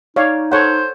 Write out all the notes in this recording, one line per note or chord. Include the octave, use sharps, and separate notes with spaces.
D#4 C#5 D5 F5
A4 C5 C#5 F#5